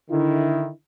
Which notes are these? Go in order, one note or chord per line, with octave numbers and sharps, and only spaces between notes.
D3 D#3 E4